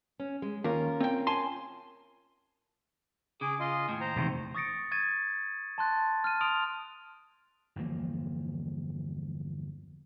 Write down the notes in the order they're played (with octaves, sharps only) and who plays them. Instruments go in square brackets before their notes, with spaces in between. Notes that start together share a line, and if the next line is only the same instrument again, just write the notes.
[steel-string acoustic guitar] C#4
G#3
[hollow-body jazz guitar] D#2 [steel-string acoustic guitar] C#4 F4 A#4
[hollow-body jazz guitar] C4 G5
G#5 A5 C6
[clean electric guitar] C#3 [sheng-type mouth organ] G#4 D6
[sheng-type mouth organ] F4 D#5 C6
[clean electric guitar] D#2 A2
[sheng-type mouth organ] C5 A#5
[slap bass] E1 C3 D#3
[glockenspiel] C#6 D#6 A6 A#6 C#7 D7
C#6 G#6 A6 D#7
A5 C6 F#6 A6
F6 D#7
C6 D#6 D7 F7
[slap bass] G1 E2 F3 A#3